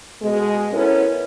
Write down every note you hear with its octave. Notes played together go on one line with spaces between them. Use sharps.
B2 G#3
B3 C#4 E4 A4 A#4